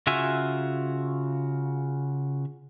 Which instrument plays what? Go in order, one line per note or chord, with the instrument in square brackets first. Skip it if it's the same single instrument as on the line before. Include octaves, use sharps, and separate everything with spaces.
[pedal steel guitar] C#3 F4 F#4 E5 G#5